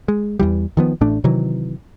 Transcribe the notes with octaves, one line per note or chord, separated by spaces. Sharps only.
G#3
E2 E3 G3
D#3 F3 B3
A1 A2 A3 D4
C3 D#3 E3 F#3